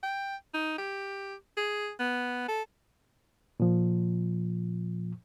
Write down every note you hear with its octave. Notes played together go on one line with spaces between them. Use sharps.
G5
D#4
G4
G#4
B3
A4
A#2 F3